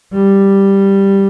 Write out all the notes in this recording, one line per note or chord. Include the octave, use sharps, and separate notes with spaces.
G3